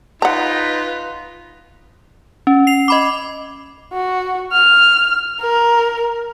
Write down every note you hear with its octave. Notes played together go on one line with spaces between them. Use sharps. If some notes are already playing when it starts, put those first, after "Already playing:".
D#4 F4 B4 F#5 A#5
C#4
C7 F7
D#5 B5 D6
F#4
F6
A#4